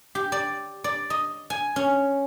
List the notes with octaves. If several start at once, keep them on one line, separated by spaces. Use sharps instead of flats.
G4
D5
D5
D#5
G#5
C#4